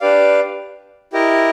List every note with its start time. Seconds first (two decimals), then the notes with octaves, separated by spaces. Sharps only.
0.01 D4 G4 B4 D5 F5
1.13 E4 G4 A#4 D#5